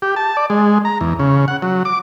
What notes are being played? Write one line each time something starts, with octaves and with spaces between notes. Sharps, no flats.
G4
A5
D5
G#3
A#5
E2
C#3
F#5
F#3
D6